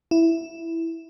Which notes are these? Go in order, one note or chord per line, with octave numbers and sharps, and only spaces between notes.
E4